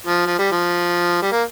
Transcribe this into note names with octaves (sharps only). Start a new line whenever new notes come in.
F3
F3
G3
F3
G3
A#3